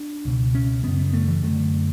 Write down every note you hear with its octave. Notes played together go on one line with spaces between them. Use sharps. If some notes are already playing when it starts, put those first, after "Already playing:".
Already playing: D4
C#2 B2
C#4
F#2 C#3 B3
B3
A3
E3
F#2 D3 A3